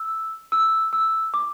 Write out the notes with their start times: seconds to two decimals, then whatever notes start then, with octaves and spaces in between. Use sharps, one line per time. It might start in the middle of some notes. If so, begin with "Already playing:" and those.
Already playing: E6
0.52 E6
0.93 E6
1.34 D6